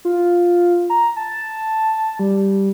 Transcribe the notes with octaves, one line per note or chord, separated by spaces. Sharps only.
F4
A#5
A5
G3